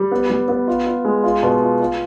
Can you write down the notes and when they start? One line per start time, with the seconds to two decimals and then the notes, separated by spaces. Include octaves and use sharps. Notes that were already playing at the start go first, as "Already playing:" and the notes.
Already playing: G3
0.12 B3
0.30 G3
0.48 B3
0.68 F4
0.87 F4
1.05 G#3
1.24 F4
1.43 B2
1.61 F4
1.80 F4